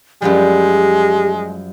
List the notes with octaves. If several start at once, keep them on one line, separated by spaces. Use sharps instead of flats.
F#2 F3 G3 G#3 G4